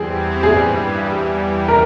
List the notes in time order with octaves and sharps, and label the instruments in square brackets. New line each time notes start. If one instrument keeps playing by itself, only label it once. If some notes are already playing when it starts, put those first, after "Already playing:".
Already playing: [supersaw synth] E2 E3 G3 C4 [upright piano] G#4
[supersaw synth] G2 E3 G3 [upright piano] G#4
[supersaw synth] E2 E3 G3
[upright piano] A#4